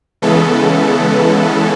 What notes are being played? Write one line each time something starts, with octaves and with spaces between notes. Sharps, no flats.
C#3 E3 G#3 B3 A4